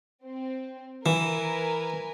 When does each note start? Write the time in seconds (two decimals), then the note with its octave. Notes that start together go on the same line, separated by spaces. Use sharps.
0.24 C4
1.06 E3 A#4 B4 G#5